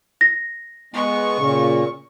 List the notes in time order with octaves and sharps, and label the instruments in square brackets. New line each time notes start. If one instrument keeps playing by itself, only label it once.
[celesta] A#6
[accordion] G#3 B3 [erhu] C#6
[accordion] A#2 [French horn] C#3